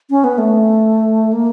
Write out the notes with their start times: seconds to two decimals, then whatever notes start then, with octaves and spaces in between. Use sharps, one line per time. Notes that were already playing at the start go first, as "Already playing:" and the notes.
0.10 C#4
0.24 B3
0.38 A3
1.33 A#3